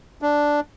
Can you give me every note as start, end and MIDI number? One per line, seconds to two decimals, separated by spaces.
0.22 0.60 62